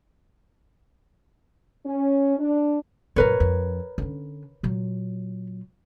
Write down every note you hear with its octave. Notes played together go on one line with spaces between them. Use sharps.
C#4
D4
F#2 A#2 A#4 B4 C#5
F2
D3 C#4
A#2 F#3